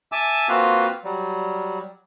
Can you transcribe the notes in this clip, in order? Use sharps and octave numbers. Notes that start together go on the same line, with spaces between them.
E5 G#5 A5 D6 E6
A#3 C4 F4 F#4 B4 F5
F#3 G3